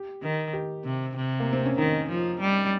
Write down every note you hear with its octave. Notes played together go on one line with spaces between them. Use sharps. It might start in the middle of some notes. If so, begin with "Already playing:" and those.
Already playing: G4
D#3
G4
C3
C3
A#3
C4
C#4
D#3 D#4
F3
G3